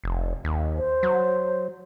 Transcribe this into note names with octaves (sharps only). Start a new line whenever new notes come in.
F1
D#2
C5
F#3